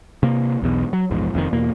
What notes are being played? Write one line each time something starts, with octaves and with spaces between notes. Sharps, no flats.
C3 A#3
B1 E2 B2
F#3
A#1 E2 G#2
F1 F2 G#2 D#3
E2 B2 A#3